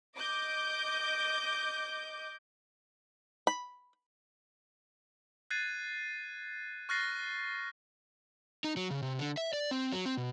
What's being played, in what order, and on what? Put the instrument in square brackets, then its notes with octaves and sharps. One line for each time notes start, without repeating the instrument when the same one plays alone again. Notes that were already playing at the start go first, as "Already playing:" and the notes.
[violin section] D#5 D6 G6
[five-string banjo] B5
[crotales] F#6 G#6 A6 C7 D#7
C#6 F6 F#6 A6 A#6 C7
[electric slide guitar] D#4
F#3
C#3
C3
D3
E5
D5
C4
F#3
C4
B2